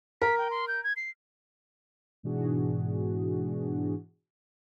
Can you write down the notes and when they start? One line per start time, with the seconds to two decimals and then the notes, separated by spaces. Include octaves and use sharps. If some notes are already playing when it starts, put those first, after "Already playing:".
0.22 A#4 B6
0.38 G5
0.51 C6
0.68 G6
0.84 G#6
0.96 C7
2.23 G#2 B2 E3 D4 F#4 G#4